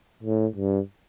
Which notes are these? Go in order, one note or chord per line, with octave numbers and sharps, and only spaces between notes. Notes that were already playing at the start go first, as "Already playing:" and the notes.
A2
G2